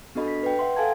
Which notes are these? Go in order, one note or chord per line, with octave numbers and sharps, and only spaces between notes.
B3 D4 F#4 A4 D#5 B5
B6
B4 G5
E5 F#5 G5 C6
A4 F5 G#5 A5 G#6